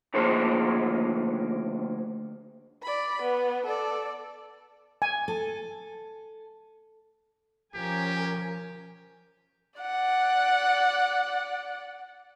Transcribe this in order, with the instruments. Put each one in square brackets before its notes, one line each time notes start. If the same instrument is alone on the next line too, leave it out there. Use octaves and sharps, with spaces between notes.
[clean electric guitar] D2 D#3 F3 A#3 G#4 C5
[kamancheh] D5 B5
B3
A4 D5
[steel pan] G#5
[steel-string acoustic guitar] A4
[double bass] F3 [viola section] C#4 A#4 G#5 [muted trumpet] G4
[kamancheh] D5 F#5